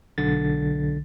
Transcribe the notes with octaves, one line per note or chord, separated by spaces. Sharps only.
B1 D3 A6